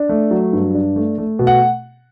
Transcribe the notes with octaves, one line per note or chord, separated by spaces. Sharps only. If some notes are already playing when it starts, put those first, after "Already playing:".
Already playing: D4
A3
F#3
G2
D4
A3
A3
B2
F#5